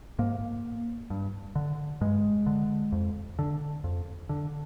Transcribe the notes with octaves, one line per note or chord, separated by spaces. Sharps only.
G#2 A#3
G2
D3
G2 G#3
D3
F2
D3
F2
D3